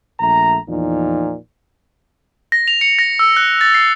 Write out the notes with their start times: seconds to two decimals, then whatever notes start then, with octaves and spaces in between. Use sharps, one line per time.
0.19 A#1 A3 A#5
0.67 E2 A#2 F3 D#4
2.52 A#6
2.68 F7
2.81 C#7
2.99 A#6
3.19 E6
3.37 F#6
3.61 A6
3.74 C7